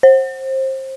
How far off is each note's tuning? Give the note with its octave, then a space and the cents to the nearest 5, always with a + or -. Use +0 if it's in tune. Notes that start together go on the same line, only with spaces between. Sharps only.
C5 +25